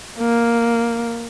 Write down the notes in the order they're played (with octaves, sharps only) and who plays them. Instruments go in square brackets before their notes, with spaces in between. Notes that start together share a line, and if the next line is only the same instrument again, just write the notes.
[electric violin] A#3